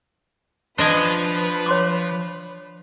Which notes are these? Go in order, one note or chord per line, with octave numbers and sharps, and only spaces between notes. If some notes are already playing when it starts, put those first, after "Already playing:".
F3 D4 B4 C5 D#5 G#5
C#5 C6 D6